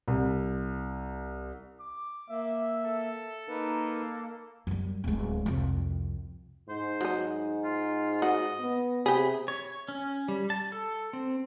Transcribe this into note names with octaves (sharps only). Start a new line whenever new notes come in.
C2
D6
A#3 E5
A4
A#3 D#4 A#4 B4
F#2 G3
D1 G#3
C2 F2
G#2 C5
F#3 D#4
F4
F#4 D#5
B3
C3 G4 G#4 B5
C#5
C#4
G3
A5
A4
C4